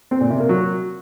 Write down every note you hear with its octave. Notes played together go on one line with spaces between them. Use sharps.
C4
A#2
C3
A#3
F#3